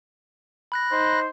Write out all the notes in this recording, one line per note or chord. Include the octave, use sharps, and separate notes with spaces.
B5 F#6 A#6
D#4 C5